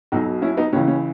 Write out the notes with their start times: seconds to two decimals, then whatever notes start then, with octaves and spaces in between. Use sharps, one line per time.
0.12 B1 B2 F#3 D#4 F#4
0.42 C#4 E4
0.57 B3 D#4
0.73 C#2 C#3 E3 C#4
0.88 C#4